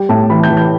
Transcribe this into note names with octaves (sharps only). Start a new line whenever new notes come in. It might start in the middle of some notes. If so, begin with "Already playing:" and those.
Already playing: G3 G5
A2 A5
E3 B5
G6
E3
G6